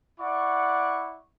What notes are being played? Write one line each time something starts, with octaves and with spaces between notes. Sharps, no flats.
E4 D5 F#5 C#6